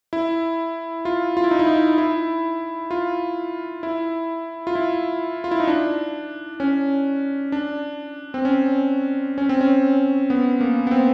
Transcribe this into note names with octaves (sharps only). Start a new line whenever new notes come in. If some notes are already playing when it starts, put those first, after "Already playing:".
E4
F4
F4
E4
D#4
E4
D#4
E4
F4
E4
F4
E4
F4
E4
D#4
D4
C#4
D4
C4
C#4
C#4
C4
C#4
B3
A#3
B3
C4